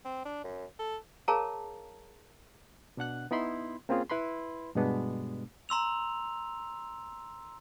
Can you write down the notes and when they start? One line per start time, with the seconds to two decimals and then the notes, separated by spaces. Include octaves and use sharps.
0.05 C4
0.25 D4
0.44 F#2
0.79 A4
1.28 G#4 A#4 C#5 F5 A5 A#5
2.97 B2 D4 F#5 F#6
3.31 B3 D#4 E4 B5 C6
3.89 A#3 C4 C#4 F4 G#4
4.10 E4 B4 B5 C6
4.75 G2 B2 G#3 B3 D4
5.69 A#5 C6 E6 F7